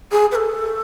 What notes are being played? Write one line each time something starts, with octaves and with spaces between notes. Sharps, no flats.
G#4
B4
A4